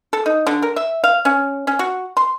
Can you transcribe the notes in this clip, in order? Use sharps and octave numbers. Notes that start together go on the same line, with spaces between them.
A4
D#4
D3
A#4
E5
F5
C#4
C#4
F#4
C6